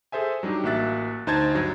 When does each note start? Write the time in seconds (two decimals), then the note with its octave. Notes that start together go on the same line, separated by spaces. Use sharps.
0.12 G#4 A4 C5 E5 G#5
0.43 F#3 G3 D4 D#4 G4
0.63 A1 A#3 F#4 E5 F#6 A6
1.27 D2 D#4 C5 A5 G#6 A6
1.55 G2 F#3